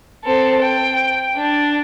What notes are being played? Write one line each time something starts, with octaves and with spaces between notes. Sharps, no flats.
C4 A4
G5
D4